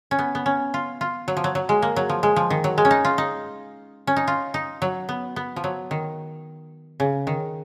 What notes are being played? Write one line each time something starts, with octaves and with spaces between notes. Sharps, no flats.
C#4
B3
B3
C#4
F4
F4
F#3
F3
F#3
F#3
G#3
A#3
F#3
F3
G#3
F3
D#3
F#3
G#3
C#4
D#4
F4
D#4
C#4
D#4
F4
D#4
F#3
B3
B3
F3
F#3
D#3
C#3
D#3